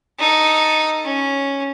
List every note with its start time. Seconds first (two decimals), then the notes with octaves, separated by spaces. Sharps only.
0.19 D#4 A4
1.05 C#4